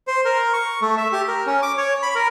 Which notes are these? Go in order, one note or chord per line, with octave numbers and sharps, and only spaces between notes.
C5
A#4
C#6
A3
E5
G4
A#4
C#4
D6
C#5
B5
A#4